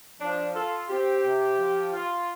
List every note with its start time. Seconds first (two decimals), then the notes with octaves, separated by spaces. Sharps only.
0.20 F3 D4
0.54 F4 A4
0.89 C4 G4
1.23 C3
1.59 F3
1.93 F4